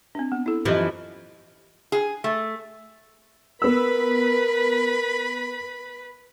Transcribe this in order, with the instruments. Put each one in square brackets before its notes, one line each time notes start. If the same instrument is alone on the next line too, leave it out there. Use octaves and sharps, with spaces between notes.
[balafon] C4 D4
B3
E4 A4
[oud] F#2 E3 F3 [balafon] G4 C5 D#5
[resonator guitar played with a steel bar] G#4
A3
[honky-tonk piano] B3 E6 [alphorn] A#4 [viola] B4 B5